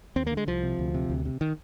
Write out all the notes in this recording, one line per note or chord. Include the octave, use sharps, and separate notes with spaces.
D#2 C4
A#3
D3
G#3
C2 F3
C3
D2
C3
D2
C3
D#3